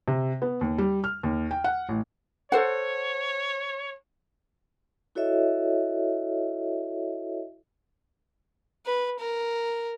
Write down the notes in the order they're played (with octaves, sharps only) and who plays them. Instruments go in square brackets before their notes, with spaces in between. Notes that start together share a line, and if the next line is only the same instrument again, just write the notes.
[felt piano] C3
B3
D#2
G3
F6
D#2
G5
F#5
A1
[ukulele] A4 C5 F#5 [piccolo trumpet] C#5
[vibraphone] E4 F#4 A4 C#5 D#5 E5
[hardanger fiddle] B4
A#4